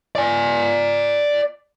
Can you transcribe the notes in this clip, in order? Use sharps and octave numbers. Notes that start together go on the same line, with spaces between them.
D5 G#5